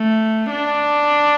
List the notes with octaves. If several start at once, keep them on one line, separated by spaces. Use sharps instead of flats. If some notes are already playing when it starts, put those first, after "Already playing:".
Already playing: A3
D4